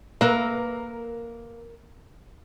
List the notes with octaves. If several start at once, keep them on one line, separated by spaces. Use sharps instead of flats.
A#3 A#4 B4 E5